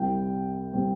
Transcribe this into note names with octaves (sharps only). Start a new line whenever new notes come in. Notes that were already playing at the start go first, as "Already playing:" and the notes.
Already playing: C2 C3 G3 C4 G5
C3 G3 C4